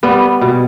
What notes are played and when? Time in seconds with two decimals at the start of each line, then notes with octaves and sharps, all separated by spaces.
0.03 G3 B3
0.41 B2